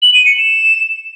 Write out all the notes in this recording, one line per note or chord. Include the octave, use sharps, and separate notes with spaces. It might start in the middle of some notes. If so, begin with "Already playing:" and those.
F#7
D#7
C#7
E7